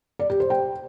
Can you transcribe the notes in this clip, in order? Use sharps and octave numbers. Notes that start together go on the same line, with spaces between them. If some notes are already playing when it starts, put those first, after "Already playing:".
D5
G4
C5
G5